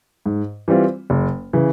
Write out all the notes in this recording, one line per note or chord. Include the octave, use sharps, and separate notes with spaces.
G#2
E3 G3 C4 F4
F#1
C#3 E3